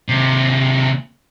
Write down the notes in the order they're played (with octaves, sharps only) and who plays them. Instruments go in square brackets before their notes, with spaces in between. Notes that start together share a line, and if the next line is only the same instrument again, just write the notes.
[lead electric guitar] D#2 C3